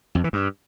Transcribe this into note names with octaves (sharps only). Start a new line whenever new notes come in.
F2
E3
G2